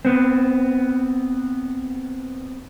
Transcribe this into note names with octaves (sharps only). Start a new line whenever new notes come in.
B3 C4